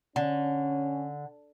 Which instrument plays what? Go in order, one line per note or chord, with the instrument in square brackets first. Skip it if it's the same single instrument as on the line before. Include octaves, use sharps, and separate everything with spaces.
[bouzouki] D3 [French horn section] C#4